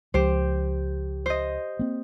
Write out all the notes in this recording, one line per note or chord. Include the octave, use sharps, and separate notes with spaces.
C#2 F3 G4 C5
C5 D#5
A#3 C4